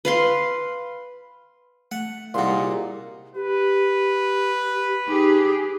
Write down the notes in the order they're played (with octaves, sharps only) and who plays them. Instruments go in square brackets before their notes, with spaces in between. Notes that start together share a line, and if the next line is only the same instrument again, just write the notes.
[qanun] B4 F5 C6
[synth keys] A3 [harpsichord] F#5
[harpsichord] C2 D#4 [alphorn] A#2 [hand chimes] G#4 F5 [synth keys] F#5 C6
[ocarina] G4 [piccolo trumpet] B4
[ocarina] D#4 [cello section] G4 G#4